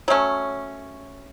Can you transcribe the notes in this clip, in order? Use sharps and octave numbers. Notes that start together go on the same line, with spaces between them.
F#3 A3 C#4